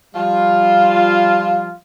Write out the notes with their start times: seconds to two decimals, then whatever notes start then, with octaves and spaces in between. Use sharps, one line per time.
0.15 F3 G3 F4